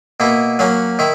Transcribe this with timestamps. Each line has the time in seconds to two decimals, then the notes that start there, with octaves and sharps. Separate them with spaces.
0.20 B2 A#3 E4
0.59 F#3 A#3 C#4
0.99 D#3 E4